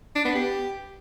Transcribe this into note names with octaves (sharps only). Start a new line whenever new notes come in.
D4
B3
G4